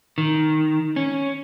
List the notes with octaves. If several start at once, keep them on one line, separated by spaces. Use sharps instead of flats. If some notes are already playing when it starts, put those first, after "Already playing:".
D#3
C#4